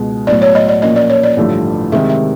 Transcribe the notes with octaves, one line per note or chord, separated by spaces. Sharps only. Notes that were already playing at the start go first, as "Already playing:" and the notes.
Already playing: C#2 B2 G#3
A2 F#3 B3 D5
C#5
D#5
D5
A#2 F3 A#3 C#4 D#5
D5
C#5
D5
A1 G2 D3 F3 A3
C3 D#3 G#3 C4 E5
E5